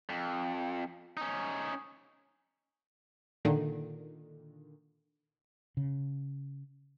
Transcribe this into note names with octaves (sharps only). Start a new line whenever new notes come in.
F2
C#4 D#4
A#2 D3 D#3
C#3